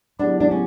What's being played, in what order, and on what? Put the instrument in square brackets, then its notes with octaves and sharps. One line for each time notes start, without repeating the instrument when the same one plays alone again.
[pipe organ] C#3 F#3 B3 E4 G4 [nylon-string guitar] D4
[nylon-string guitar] D4
C#4